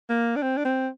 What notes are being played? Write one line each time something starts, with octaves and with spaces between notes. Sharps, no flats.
A#3
D4
C4
D4
C4